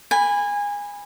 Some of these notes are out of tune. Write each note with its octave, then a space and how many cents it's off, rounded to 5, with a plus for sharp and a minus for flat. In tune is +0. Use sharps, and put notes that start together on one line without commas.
G#5 -20 B5 +0